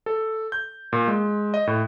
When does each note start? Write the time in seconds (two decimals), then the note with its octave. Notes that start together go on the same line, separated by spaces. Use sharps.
0.06 A4
0.52 G6
0.93 A#2
1.08 G#3
1.54 D#5
1.67 A2